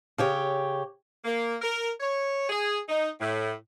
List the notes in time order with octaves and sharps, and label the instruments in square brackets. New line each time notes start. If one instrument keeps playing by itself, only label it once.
[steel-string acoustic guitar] C#3 G4 C#5
[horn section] A#3
A#4
C#5
G#4
D#4
A2